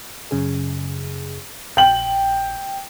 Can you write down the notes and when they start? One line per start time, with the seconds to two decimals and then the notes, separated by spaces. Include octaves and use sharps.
0.31 F#2 C#3 G#4
1.77 A#1 G5 F#7